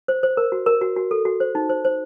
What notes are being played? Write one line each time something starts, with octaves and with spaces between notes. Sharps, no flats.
C5
C5
A#4
F#4
A#4
F#4
F#4
A4
F#4
C5
D#4
C5
C5